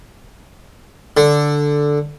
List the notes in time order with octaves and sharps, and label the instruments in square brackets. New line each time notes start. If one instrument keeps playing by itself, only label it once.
[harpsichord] D3